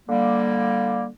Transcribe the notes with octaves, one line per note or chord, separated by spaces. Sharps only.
D3 G3 A#3